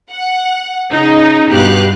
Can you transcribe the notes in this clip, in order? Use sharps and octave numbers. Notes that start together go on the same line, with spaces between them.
F#5
C#3 D#4
G2 B2 G4 B4 F5 F#6